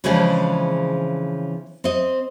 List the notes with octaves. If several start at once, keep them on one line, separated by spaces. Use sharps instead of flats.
C#3 E3 F3 G#3 C4 D4
C4 D#5